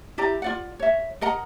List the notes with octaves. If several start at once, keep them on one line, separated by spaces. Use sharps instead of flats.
E4 G4 D5 A#5
F4 D5 F#5
C#5 E5
A#4 D#5 F#5 A#5